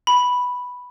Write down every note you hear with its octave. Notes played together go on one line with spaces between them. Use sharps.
B5